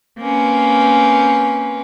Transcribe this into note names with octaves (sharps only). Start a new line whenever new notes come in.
A#3 C4 C#4 B4